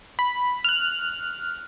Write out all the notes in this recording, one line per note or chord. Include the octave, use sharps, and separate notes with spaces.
B5
F6 F#6